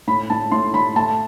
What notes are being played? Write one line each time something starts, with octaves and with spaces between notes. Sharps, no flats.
A2 B5
A2 A5
A2 C6
A2 B5
A3 A5